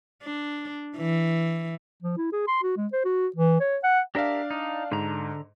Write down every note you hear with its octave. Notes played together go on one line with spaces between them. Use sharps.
D4
E3
F3
E4
G#4
C6
F#4
G#3
C5
F#4
E3
C#5
F#5
D4 G4 A#4 D5 E5 F5
D#4
G#2 D3 A#5